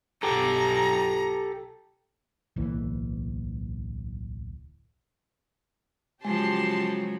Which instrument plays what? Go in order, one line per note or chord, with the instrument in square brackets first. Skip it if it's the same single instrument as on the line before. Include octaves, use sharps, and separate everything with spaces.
[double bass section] B1 [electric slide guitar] G4 A4 [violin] A#5
[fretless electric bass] D1 B1 E3 A#3
[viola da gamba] C#3 F3 F#3 [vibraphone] G#3 [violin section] G4 A5 C6